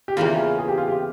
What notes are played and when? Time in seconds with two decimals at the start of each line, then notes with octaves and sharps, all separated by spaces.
0.08 G4
0.17 E2 C#3 E3 A#3 F4
0.58 G#4
0.68 G4
0.78 F4
0.88 G4